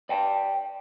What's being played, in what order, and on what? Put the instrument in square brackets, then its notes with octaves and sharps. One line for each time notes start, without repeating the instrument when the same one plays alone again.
[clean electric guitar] D5 G5 A5